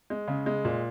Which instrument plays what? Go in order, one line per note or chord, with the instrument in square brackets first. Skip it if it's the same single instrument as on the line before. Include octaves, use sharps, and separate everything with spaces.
[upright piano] G#3
C#3
G#3
A#2